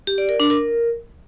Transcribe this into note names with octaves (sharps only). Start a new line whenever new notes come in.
G4
D5
A#4
D4
A#4